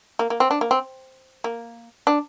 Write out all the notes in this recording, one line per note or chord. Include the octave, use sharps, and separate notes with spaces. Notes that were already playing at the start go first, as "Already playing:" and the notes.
A#3
A#3
C4
D4
A#3
C4
A#3
D4